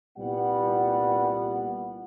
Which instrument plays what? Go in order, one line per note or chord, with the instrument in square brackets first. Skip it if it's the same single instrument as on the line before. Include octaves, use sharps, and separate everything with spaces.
[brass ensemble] C2 A#2 G3 B3 F#5